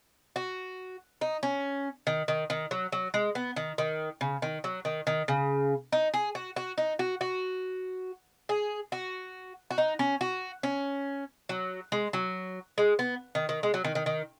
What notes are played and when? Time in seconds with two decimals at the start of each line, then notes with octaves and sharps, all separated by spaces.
0.36 F#4
1.21 D#4
1.43 C#4
2.07 D#3
2.28 D#3
2.50 D#3
2.71 F#3
2.92 F#3
3.14 G#3
3.35 B3
3.56 D#3
3.78 D#3
4.21 C#3
4.42 D#3
4.64 F#3
4.85 D#3
5.07 D#3
5.28 C#3
5.92 D#4
6.14 G#4
6.35 F#4
6.56 F#4
6.78 D#4
6.99 F#4
7.21 F#4
8.49 G#4
8.92 F#4
9.71 F#4
9.78 D#4
9.99 C#4
10.21 F#4
10.63 C#4
11.49 F#3
11.92 G#3
12.13 F#3
12.78 G#3
12.99 B3
13.35 D#3
13.49 D#3
13.63 G#3
13.74 F#3
13.84 D#3
13.95 D#3
14.06 D#3